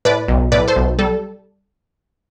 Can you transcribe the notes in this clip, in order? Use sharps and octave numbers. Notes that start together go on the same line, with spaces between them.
A2 B4 D5
B1
A2 B4 D5
A4 C5
B1
G3 A4